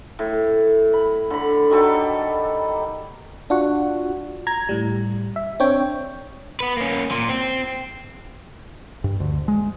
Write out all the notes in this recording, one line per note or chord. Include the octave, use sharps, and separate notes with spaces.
A2
B5
D3 B5
D#3 F#3 G3 A4
D4 F4 F#4 F#5
A#5 G#6
A2 G3
E5
C4 D4 C#5 G5
B3 B4
A#3 C#4
A#2
C4
G2
D2
G#3